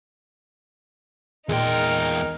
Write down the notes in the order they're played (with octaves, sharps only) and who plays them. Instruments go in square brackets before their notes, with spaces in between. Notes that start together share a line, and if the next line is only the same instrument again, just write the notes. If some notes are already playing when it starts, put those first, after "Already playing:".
[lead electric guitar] E2 G5 [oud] A#2 G#3 [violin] D#4 [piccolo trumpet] A#4